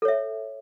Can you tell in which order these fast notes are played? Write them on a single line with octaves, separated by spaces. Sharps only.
A4 C#5 E5